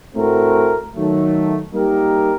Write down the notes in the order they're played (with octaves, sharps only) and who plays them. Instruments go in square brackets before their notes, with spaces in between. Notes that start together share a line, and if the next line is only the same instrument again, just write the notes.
[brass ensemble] A2 A3 C4 F#4 A#4
D#3 F#3 A3
G3 A#3 D#4 G4 A#4